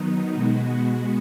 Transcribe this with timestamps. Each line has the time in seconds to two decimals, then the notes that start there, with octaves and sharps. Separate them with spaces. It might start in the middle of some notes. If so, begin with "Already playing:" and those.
Already playing: D#3 F#3 B3 D#4
0.35 B2 G#3 B3 F#4